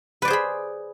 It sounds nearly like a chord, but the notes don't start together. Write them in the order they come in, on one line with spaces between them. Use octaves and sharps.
B4 D5 C5 G#4 B5